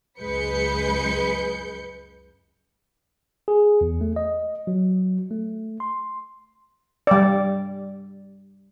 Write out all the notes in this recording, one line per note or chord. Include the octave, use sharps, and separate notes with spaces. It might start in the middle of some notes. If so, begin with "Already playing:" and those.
C#2 F#2 G#3 B4 G6 C#7
G#4
E2
A3
D#5
F#3
A3
C6
G3 D5